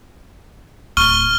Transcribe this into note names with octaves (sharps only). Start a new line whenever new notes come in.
D1 C#6 F6 G7